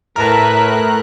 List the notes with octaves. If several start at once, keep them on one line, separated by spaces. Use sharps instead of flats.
A2 A#4 B4 E5 A5 A#5 F#6